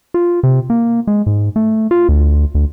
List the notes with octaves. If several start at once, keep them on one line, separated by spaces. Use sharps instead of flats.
F4
C3
A#3
G#3
G#2
A3
F4
D2
D2